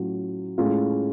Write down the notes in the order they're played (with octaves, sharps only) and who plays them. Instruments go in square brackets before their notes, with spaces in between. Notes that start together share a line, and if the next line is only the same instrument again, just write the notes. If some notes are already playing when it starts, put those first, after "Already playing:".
Already playing: [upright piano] A2 F#3 C#4 F4
A2 G#3 C#4 F4